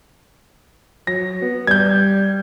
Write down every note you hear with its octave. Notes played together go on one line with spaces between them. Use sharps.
F#3 A#6
B3
G3 G6 G#6